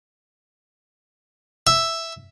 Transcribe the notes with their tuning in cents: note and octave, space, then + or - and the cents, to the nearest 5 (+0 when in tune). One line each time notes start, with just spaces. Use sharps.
E5 +0